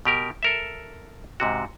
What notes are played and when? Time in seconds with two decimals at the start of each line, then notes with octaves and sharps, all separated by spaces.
0.05 B2 G4 A#4
0.43 A4 A#4 E5
1.40 G#2 C3 F#4